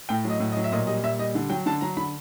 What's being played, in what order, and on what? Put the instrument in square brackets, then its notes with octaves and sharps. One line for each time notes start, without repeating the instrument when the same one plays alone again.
[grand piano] A2 G5
F#3 D#5
A2
D#5
F#3
E5
A#2 D#5
G3 D#5
A#2 E5
G3 D#5
D3
F#3 G5
D3 A5
F#3 A#5
D3 B5